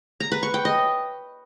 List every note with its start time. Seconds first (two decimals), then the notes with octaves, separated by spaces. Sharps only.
0.20 A#5
0.32 B4
0.43 C#6
0.54 G5
0.65 D#5